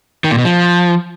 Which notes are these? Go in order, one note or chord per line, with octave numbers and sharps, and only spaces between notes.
D#3
A#2
B2
F3